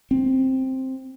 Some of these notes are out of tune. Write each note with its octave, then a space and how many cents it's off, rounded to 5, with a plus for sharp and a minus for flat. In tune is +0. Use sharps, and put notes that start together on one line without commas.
C4 +5